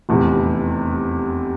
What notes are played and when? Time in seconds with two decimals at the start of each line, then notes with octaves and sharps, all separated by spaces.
0.09 F1 E2 C3